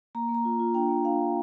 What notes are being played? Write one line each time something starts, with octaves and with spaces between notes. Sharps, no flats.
A#3 A#5
A#3
A#5
F4
F4
D4 G5
A#3
D4 F5
D4